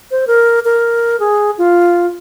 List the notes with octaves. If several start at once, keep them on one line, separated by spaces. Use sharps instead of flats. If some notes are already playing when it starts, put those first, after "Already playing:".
C5
A#4
A#4
G#4
F4